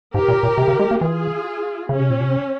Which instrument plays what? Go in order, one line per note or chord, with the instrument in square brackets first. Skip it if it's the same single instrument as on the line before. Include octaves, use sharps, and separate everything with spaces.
[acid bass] G#2 [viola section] G4 A#4
[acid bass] A#2
A#2
C3
C#3
G#3
A#3
[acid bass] E3 [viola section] F4 G#4
[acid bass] C#3 [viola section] C#4
[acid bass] C3
A#2
C3